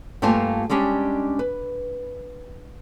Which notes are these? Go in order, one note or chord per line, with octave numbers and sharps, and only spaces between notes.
G2 A3 A#3 F4 G#5 A5
G3 G#3 C#4 D4 G4
B4